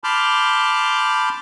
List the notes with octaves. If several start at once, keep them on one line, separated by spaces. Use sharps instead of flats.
A5 B5 C6 D6 F6 G6